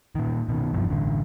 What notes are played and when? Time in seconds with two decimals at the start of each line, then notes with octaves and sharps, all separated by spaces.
0.15 A#2 D#3
0.49 B2 D3 D#3
0.73 F1 G2 C3 F3
0.89 A1 D3